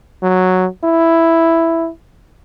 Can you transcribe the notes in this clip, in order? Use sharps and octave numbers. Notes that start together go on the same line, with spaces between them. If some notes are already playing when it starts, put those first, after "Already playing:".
F#3
E4